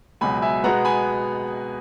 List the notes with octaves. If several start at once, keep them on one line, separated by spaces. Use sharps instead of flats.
C#2 B2 F#3 G#5 B5
E5 G#5
B2 G#3 B3 F#5 A#5
G#5 B5